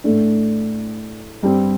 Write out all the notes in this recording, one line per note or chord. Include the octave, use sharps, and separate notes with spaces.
A2 A3 D4
G2 G3 C4